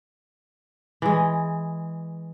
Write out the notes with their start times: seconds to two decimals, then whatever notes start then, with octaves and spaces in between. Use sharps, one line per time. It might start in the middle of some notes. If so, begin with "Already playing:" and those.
1.02 E3 G#3